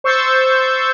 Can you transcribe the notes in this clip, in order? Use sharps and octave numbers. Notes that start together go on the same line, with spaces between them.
C5 C#6 E6 G6 A6